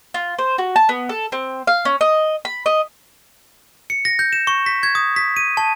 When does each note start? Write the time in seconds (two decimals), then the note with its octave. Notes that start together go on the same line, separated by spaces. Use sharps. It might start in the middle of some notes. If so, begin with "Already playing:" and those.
0.14 F4
0.38 C5
0.58 F#4
0.76 A5
0.89 B3
1.09 A4
1.32 C4
1.67 F5
1.85 C#4
2.01 D#5
2.45 B5
2.66 D#5
3.90 C#7
4.05 A#6
4.19 G6
4.33 E7
4.47 C#6
4.66 B6
4.83 G#6
4.95 D#6
5.16 B6
5.36 D#7
5.57 A5